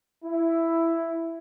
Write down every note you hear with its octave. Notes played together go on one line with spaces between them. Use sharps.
E4